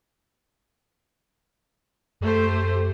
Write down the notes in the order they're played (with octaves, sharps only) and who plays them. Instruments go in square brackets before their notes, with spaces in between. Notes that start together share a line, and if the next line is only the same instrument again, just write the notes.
[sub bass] F#2 [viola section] A3 G4 C5